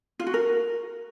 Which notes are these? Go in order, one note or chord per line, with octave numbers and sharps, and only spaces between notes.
F4
F#4
A#4